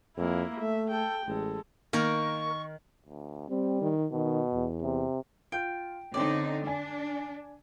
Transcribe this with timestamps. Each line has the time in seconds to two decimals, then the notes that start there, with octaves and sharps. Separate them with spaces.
0.17 F2 A#3 E4
0.61 A3 E5
0.91 A4 G5
1.27 A1 G#3 A4
1.93 D#3 A#3 A#4 C#6
3.07 D2
3.49 G3 C4
3.82 D#3
4.12 B2 D#3
4.53 E2
4.82 C3
5.52 F4 G5
6.14 D3 C4 C#4 D#4 D5 C6
6.67 D4 G#5